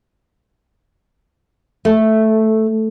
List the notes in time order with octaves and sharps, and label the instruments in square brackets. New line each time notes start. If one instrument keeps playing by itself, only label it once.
[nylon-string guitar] A3